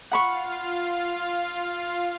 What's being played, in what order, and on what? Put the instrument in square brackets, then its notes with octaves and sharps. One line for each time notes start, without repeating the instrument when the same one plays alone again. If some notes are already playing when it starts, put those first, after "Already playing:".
[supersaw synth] F4 F5 [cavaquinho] F#5 B5 C#6